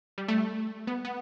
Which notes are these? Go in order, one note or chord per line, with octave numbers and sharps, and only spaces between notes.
G3
A3
B3
B3